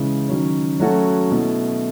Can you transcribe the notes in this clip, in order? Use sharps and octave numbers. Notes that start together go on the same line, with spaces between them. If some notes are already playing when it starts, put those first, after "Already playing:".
Already playing: C#3 E3 G#3
D#3 F#3 C#4
F#3 A3 C#4 F#4 A4
B2 A3 E4